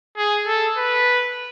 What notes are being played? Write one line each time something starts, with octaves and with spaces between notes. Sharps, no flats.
G#4
A4
B4